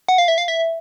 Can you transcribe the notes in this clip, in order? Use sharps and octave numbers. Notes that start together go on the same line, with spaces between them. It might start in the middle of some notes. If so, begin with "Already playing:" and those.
F#5
F5
E5
F5
E5